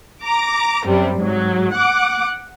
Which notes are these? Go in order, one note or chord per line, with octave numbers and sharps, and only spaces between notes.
A#5 D6
F#2 C3 G3
G#2 F#3
F#5 D6